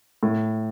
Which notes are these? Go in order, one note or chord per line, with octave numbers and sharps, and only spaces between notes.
A2